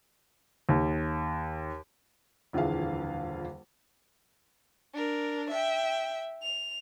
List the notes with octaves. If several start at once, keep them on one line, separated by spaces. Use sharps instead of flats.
D#2
D#1 F2 D3 E3 G#4 F5
D4 A#4
E5 G5
F7